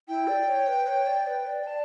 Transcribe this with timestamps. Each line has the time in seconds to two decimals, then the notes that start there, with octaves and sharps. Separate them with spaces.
0.08 E4 G5
0.28 D5
0.48 C#5
0.68 B4
0.87 C#5
1.07 D5
1.27 B4
1.47 D5
1.62 G5
1.67 D5 A5